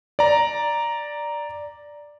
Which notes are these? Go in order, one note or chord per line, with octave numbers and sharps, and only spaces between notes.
D5 A#5